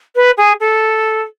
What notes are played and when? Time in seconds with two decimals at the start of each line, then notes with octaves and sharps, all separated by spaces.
0.15 B4
0.37 G#4
0.60 A4